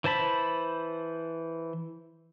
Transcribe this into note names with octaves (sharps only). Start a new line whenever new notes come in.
E3 C5 A5 B5